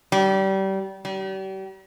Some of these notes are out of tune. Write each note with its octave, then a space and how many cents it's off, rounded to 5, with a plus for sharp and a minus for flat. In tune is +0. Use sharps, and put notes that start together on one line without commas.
G3 -25
G3 -40